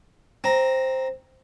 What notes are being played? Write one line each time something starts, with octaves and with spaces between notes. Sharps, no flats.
C4 A#5